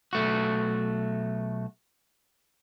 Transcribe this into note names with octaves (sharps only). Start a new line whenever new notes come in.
B1 A3 F#4